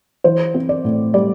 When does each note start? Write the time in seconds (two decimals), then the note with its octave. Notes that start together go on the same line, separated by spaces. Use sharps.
0.24 E3 C5
0.54 C4
0.69 D5
0.85 A2
1.14 G3 D5